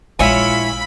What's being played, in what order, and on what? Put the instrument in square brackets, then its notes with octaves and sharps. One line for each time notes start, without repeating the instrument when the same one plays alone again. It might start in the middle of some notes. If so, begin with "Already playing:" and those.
[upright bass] A#1 G#3 [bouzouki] E4 C#5 G#5 [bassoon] F4 [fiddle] B5